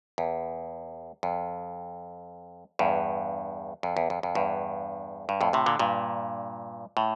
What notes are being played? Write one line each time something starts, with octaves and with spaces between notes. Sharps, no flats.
E2
F2
E2 G2
F2
E2
F2
F2
E2 G2
G2
F2 A2
A2 C3
A#2 D3
G2 A#2
A2